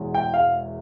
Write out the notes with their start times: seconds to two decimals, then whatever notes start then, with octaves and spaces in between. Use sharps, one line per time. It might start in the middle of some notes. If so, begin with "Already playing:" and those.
Already playing: E1 E2 E3 G#3
0.14 G5
0.34 F5